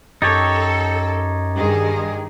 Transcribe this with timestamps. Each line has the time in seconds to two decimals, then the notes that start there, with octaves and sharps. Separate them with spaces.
0.22 F#2 D#4 G4 A4 C#5 A6
1.56 G2 D#3 G#4